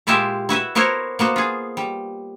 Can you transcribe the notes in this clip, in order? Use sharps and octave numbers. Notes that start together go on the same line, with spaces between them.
A#2 G#3 E4 F4 G4 E5
E4 F#4 B4 E5
B3 E4 F#4 A#4 C5 C#5
A#3 B3 F#4 C5
F4 G#4
G3